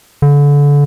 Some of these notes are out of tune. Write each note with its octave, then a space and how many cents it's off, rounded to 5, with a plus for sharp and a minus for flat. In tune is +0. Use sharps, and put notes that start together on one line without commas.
D3 -30